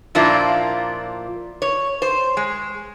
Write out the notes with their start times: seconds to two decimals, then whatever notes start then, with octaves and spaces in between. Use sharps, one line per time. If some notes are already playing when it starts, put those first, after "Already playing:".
0.15 A#2 F3 A#3 D4 E4 F4
1.62 C#5
2.02 C5
2.37 G#3